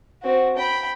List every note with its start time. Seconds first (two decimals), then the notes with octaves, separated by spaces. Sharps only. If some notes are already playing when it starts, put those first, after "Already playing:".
0.23 C4 F#4
0.57 G5 B5